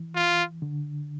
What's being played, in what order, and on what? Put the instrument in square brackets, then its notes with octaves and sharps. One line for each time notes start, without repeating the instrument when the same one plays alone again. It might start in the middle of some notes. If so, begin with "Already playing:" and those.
Already playing: [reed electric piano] E3
[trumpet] F4
[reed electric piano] D3